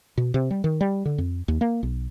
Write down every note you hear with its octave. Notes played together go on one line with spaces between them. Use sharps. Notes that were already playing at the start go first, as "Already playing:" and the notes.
B2
C3
G3
D#3
G3
D3
F2
D#2
A#3
B1